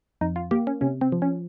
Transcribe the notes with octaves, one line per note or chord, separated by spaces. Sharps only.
F2 D#4
F4
A#3 G4
C#4
C3 C#4
C4
F3
C#4